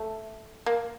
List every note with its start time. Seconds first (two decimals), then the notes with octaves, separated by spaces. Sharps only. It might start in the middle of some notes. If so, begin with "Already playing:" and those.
Already playing: A3
0.66 A#3